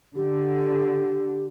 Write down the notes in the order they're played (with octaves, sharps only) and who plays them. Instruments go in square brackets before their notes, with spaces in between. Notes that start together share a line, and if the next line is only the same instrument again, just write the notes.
[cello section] D3 [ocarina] G4